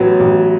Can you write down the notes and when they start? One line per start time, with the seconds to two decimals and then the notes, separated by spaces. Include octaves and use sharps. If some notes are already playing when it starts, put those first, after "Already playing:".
Already playing: A1 F#3 B3 B4
0.19 A1